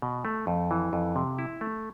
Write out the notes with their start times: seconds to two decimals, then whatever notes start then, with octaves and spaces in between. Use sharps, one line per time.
0.02 B2
0.25 A3
0.47 F2
0.71 E3
0.93 F2
1.16 C3
1.39 E4
1.61 A3